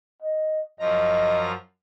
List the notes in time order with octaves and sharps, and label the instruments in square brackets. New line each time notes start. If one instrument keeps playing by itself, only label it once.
[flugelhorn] D#5
[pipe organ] F#2 F3 A#5 [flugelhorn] D#5